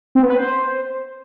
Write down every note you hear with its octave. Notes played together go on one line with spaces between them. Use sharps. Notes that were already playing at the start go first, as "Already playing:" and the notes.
C4
B3
B4
C5